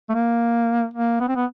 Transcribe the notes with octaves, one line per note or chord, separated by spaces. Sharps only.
A3
A#3
A#3
B3
C4
B3